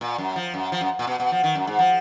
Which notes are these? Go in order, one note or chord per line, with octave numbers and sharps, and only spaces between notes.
A#2
F#2
F3
F#2
F3
F#2
A#2
B2
B2
F3
D#3
F#2
G#2
F3